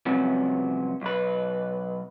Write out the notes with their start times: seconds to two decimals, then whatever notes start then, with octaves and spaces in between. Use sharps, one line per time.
0.06 C2 F2 C3 F#3 B3 C#4
1.01 B1 B4